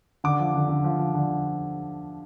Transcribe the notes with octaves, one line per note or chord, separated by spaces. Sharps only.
D3 D6
F3
D3
D3
F3
F3
D3